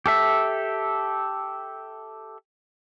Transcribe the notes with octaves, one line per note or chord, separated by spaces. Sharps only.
G4 A4 E5